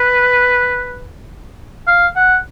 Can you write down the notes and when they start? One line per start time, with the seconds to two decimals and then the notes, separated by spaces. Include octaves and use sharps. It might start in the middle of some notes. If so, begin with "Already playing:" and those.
Already playing: B4
1.87 F5
2.16 F#5